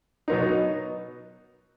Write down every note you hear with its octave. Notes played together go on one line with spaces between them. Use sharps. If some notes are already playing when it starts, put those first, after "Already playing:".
B2 F#3 B3 D#4